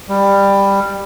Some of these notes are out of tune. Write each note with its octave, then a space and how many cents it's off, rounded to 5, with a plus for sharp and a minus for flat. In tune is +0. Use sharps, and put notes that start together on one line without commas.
G3 +15